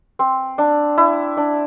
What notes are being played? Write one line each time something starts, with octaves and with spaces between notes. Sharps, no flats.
C4
D4
E4
D4